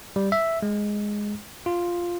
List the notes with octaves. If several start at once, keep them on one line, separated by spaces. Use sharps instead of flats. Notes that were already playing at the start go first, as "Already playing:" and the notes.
G3
E5
G#3
F4